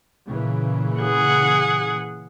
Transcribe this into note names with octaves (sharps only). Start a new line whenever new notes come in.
A#2 C#3 E3
G#4 F#5